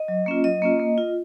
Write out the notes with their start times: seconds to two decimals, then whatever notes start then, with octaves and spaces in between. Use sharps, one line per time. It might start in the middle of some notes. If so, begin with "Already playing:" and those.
Already playing: D#5
0.08 F#3
0.26 A#3 C#4 F4
0.44 F#3 D#5
0.62 A#3 C#4 F4
0.80 A#3
0.98 F4